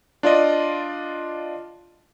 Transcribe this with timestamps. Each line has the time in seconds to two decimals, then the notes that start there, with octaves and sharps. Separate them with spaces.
0.23 D4 F4 D5 D#5